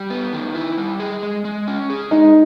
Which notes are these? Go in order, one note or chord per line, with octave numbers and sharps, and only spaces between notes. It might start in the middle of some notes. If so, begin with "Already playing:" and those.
Already playing: G3
B3
D#3
E4
G3
G#4
G#3
G#3
C#4
G#4
G#3 D#4